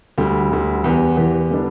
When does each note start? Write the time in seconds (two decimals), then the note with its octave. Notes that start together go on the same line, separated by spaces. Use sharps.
0.18 D2 D3 G3
0.51 D2 D3 G3
0.84 E2 E3 B3 G4
1.17 E2 E3 B3 G4
1.51 D3 G3 B3 D4